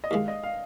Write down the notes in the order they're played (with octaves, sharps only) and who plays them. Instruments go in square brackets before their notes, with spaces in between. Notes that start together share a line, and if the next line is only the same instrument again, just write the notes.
[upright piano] D#5
[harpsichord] D#2 D#3 G#3 [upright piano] F5
[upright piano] D#5
F5